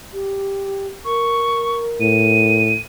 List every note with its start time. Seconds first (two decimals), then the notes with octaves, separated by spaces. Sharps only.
0.12 G4
1.04 A#4 C#6
2.00 A2 D#7